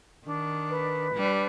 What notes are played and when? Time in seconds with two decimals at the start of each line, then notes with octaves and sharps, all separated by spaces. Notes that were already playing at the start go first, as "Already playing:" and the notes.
0.25 D#3 D4
0.70 B4
1.14 G3 D4